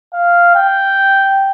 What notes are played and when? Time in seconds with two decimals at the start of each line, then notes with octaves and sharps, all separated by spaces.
0.14 F5
0.55 G5